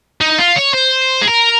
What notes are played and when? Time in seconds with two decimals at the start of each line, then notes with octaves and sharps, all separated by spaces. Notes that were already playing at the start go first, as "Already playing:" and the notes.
0.21 D#4
0.39 F4
0.57 C#5
0.74 C5
1.22 G#4
1.28 A#4